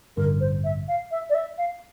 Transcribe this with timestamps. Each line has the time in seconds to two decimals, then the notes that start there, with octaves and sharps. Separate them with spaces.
0.17 A1 G2 D3 A#4
0.40 C5
0.64 E5
0.88 F5
1.11 E5
1.29 D5
1.34 E5
1.58 F5